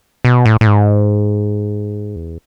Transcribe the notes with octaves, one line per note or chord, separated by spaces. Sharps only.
B2
A2
A2
G#2
E2